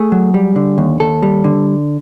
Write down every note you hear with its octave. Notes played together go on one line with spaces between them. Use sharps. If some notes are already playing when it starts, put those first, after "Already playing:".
Already playing: A3 G#4
F#3
G3
D3
D#2
D#2 A4
G3
D3